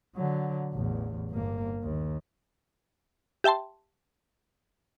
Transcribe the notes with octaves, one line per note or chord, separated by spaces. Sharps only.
D3 F#3
A1 E2
G1 A#3
D#2
G4 E5 G5 A5 C6